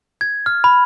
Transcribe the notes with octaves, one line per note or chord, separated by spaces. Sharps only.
G#6
F6
B5